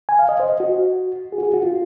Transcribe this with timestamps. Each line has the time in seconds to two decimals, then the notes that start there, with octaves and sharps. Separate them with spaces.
0.09 G#5
0.19 F5
0.29 D#5
0.40 C5
0.49 D#5
0.60 F#4
1.32 G#4
1.38 F#4
1.43 G#4
1.54 F#4
1.63 F4